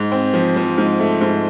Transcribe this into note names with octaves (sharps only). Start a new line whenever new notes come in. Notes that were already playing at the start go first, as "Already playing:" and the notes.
Already playing: G#2
C4
F3
F3
G#2
A3
G#2